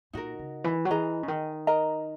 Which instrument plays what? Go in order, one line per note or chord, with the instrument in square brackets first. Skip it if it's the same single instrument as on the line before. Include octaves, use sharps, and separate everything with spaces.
[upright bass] A#2 [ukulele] D#4 F#4 A#4
[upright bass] C#3
E3
F#3
[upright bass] E3 [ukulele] G#4 D#5 A#5
[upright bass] C#3
D#3
[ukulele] A#4 D#5 A#5